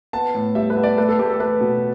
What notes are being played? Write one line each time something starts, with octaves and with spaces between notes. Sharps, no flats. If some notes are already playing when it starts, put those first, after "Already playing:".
B3 A5
A2
G3 E5
B4
B3
D5
A3 B4
A4
A3 G4
A4
A3 B4
B2